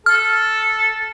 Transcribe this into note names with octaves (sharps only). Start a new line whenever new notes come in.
A4 F6